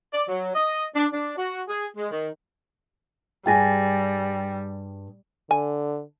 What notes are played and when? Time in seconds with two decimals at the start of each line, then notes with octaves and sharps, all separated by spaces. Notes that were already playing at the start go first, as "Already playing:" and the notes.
0.13 D5
0.28 F#3
0.55 D#5
0.95 D4
1.12 D4
1.36 F#4
1.68 G#4
1.97 G#3
2.10 D#3
3.46 G2 G3 G#4 G5 G#5 A6 A#6
5.51 D3 G#5